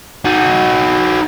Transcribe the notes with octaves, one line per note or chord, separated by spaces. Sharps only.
D#4 F#4